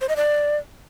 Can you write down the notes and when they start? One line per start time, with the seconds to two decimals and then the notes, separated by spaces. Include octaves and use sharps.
0.01 C5
0.09 D#5
0.16 D5